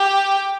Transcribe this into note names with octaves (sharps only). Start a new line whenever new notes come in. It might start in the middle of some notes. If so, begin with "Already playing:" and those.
Already playing: G4